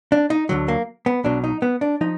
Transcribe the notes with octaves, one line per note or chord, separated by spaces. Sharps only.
D4
D#4
D2 D3 F#3
A#3
B3
B1 B2 F#3 D4
D#4
B3
D4
F3 D#4